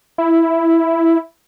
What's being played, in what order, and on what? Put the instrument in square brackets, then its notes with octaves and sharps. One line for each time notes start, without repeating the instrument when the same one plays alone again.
[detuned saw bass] E4